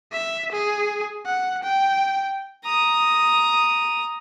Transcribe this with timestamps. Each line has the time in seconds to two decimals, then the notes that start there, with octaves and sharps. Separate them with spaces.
0.12 E5
0.52 G#4
1.25 F#5
1.63 G5
2.64 A#5 D#6